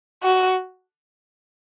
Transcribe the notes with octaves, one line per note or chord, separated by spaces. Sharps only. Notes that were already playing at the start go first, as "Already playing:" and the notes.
F#4